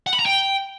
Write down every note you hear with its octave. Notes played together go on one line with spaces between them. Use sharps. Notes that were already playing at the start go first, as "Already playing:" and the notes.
F#5
B5
A#5
G5